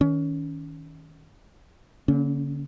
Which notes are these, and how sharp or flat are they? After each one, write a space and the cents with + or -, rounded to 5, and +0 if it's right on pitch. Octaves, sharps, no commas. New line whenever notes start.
D#3 +20 C#4 +20
D3 -40 A#3 +0 C#4 +0